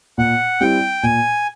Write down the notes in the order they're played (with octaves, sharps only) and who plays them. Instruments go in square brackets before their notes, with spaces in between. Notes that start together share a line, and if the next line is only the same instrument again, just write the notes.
[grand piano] A#2 [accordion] F#5
[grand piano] G3 C4 E4 [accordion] G5
[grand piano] A#2 [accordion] G#5